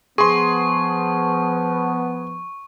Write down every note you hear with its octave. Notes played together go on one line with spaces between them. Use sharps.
F3 B3 G#4 C6 C#6